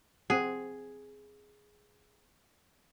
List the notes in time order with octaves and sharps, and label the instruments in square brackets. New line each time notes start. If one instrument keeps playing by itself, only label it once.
[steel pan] C4 F#5 [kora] G#4